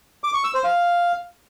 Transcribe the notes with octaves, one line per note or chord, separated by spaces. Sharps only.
D6
C#6
E6
C5
F5